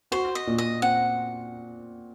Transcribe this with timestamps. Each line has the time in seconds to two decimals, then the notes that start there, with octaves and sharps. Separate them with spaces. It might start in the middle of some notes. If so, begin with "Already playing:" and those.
0.12 F#4 C5
0.35 D#5
0.47 A#2
0.58 D#5
0.82 C4 F#5